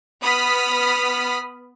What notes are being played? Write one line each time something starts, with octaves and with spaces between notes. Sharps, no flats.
B3 B5 D#6 F6 B6